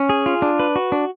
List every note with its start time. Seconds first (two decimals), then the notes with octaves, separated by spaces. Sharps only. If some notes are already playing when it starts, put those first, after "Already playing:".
Already playing: C#4
0.09 G#4
0.26 F4
0.42 D4
0.59 B4
0.76 F#4
0.92 D4